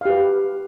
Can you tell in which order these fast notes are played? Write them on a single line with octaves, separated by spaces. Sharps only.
F5 G4 B4